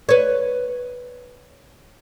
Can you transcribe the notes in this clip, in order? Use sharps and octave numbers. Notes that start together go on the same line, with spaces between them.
B4 C#5